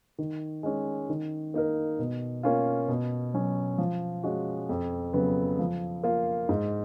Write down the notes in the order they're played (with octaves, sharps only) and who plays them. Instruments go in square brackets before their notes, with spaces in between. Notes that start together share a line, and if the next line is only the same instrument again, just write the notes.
[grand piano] D#3
G#3 C#4
D#3
A#3 D#4 A#4
B2
A#3 C#4 F4
B2
F#3 C#4
F3
G#3 C#4 F#4
F2
C#3 F#3 B3
F3
A#3 F4
G#2